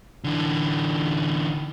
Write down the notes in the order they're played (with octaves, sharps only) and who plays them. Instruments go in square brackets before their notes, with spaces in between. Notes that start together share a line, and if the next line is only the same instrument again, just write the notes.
[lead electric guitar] D3 E3